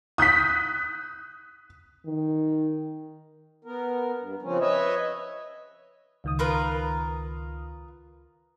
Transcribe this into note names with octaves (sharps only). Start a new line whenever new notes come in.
D#6 F#6 G6 B6
D#3
B3 A#4
G2
C#3 F3 C4 C#4
B4 C#5 D#5 E5
C#2 D#3 D#6
F4 A#4 B4